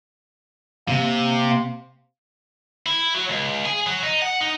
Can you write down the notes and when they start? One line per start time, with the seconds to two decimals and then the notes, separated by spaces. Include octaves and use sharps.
0.88 C3 A#3
2.86 E4
3.14 F#3
3.29 C#2
3.65 G#4
3.87 F#3
4.03 D#4
4.22 F#5
4.41 D#4